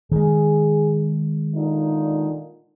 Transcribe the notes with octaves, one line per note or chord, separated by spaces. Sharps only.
D#3 G#3 G#4
A#2 D3 D#4